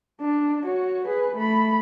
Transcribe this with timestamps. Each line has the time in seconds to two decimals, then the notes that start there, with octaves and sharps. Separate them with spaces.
0.21 D4
0.65 F#4 C#5
1.08 G#4 B4
1.36 A3 B5